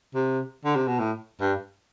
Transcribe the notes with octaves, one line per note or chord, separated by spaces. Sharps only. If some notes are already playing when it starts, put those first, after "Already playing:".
C3
D3
C3
B2
A2
G2